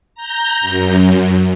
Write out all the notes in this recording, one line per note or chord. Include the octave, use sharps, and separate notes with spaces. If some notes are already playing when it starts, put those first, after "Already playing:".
A#5 G6
F#2